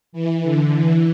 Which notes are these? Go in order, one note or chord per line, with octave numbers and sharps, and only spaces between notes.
E3
D3
E3